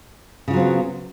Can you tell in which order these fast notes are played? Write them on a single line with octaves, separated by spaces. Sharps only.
C#3 F4 F#3 C4 B3